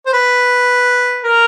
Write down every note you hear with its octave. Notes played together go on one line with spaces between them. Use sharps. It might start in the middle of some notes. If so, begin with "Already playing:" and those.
C5
B4
A#4